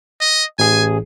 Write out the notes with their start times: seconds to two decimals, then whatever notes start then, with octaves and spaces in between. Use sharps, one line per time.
0.21 D#5
0.59 A1 G#4 G#5